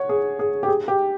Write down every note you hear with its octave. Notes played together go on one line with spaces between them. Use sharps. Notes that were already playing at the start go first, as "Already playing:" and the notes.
Already playing: C#5 F#5
G#4
G#4
G4
G#4
G4